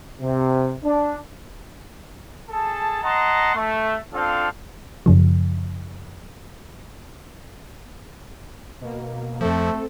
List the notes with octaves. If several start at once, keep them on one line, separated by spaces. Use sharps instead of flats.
C3
D4
G#4 A4 A5
D#5 F#5 A5 A#5 C6
A3
C4 D4 F4 A4 F5
F#2 C#3 F3
B2 A#3
F2 F3 A3 C4 A4